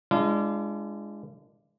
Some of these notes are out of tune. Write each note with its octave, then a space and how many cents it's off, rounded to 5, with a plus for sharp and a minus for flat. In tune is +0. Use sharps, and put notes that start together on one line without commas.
G#3 +0 D4 +0 F4 -45